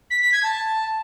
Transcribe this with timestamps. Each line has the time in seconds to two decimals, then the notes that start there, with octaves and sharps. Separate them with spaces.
0.10 B6
0.21 B6
0.32 G#6
0.43 A5